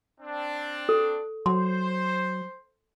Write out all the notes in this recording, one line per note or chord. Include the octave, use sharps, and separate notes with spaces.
C4 D4
A4
F#3 C5 C6